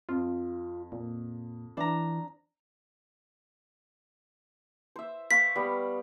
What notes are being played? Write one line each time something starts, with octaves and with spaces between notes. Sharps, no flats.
F2 F4
A#2
E3 D4 A#5
C5 E5
C5 F5 C#6 B6
G3 B3